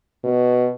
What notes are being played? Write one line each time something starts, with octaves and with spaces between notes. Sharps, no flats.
B2